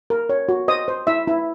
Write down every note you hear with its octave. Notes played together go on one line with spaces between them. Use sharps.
A#4
C#5
F#4
C5 D#5 D#6
C5
E4 E5 E6
E4